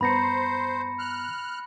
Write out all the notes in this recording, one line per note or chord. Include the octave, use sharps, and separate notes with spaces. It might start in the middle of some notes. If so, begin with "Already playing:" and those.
G2 B3 C5 A#5 B5 A#6 C#7
F6 F#6